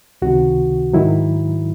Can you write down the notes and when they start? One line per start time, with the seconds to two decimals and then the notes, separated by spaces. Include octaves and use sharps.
0.22 C#2 C3 D#3 F#4
0.93 G#2 D#3 F#3 E4